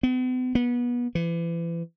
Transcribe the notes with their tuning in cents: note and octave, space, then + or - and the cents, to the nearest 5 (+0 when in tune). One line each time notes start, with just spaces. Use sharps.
B3 +45
B3 -25
E3 +35